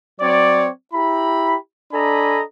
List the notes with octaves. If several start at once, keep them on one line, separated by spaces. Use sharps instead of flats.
F#3 C4 C#5 D5
E4 G4 A#5 B5
D4 A4 D#5 G#5 A#5 B5